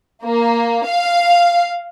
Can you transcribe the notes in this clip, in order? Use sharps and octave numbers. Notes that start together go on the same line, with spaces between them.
A#3
F5